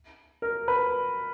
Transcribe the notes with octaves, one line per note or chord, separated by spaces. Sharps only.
A#4
B4